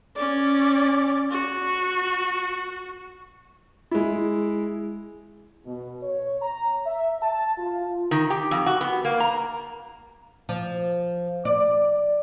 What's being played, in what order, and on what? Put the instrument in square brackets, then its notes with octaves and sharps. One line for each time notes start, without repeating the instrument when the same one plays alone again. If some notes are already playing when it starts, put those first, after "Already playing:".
[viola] C#4 D5
F#4
[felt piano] G#3 E4
[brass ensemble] B2
C#5
A#5
E5
A5
F4
[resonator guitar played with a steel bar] D#3
G4
F2
F#4
B3
A#3
A#5
[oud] F3
D5